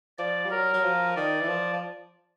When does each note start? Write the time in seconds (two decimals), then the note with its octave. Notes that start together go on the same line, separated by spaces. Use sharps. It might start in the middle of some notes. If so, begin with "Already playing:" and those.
0.18 F3 D5
0.45 G3
0.51 F#3 A#4
0.74 F#3
0.84 F3
1.16 D#3 D5
1.41 E3
1.48 F3
1.73 F3